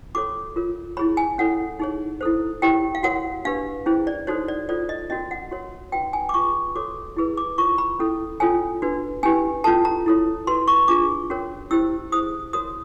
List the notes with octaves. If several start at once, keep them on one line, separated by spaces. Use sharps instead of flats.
C#4 F#4 A4 C#5 D6
F4 A#4 C#5
E4 G#4 C#5 B5
G#5
C#4 E4 A4 C#5 F#5
D#4 G#4 C#5
E4 A4 C5
E4 G4 A#4 C#5 G5
F5
F#4 A#4 C#5 F#5
D4 G4 B4 F5
C#4 E4 G#4 C5
D5
D#4 F#4 A4 C5 C#5
D5
F4 A4 C5 D5
D#5
C#4 F#4 A#4 D#5
F#5
F#4 A#4 C#5
D#4 F#4 B4 G5
G#5
D6
F4 G#4 B4 C#6
F#4 A4 C#5 D6
E4 G#4 B4
D6
F4 A#4 C#5 C#6
B5
C#4 E4 A4
C#4 F4 A4 C#5 G#5
D4 F#4 B4
C#4 E4 G4 B4 G#5
C#4 F4 A4 A5
A#5
E4 A4 C#5
F#4 B4 C6
C#6
D4 F4 G#4 D6
C#4 F#4 A#4 C#5
C#4 E4 G4 C5 E6
E4 G#4 C5 D#6
F#4 A#4 C#5 D#6